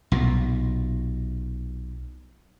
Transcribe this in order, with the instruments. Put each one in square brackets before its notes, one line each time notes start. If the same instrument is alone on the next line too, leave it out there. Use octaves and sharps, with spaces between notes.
[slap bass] B1 A#2